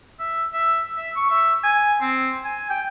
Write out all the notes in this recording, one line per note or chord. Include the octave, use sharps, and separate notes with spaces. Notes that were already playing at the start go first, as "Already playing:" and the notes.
E5
E5
E5
C#6
E5
G#5
C4
G#5
G5